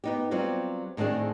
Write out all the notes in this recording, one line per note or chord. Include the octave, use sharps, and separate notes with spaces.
B3 D#4 G4
F#3 G3 C4 F4
A2 D#3 C4 D4 G#4